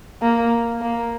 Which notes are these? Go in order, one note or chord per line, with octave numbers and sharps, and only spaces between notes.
A#3
A#3